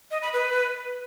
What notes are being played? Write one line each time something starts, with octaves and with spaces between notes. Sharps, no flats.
D#5
B5
B4